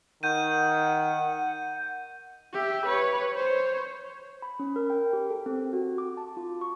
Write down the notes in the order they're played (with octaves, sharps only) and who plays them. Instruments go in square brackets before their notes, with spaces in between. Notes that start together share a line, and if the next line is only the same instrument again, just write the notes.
[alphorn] D#3 [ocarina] F#5 [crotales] G6 D#7
[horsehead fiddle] G4 E5
B4 C#5
C5 C#5
[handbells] B5
C#4
A#4
G5
G4
A4
C4
F#4
D6
A5
F4
C#6